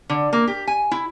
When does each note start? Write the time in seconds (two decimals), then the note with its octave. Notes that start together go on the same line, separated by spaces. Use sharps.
0.10 D3
0.33 A#3
0.48 G4
0.67 G#5
0.91 E4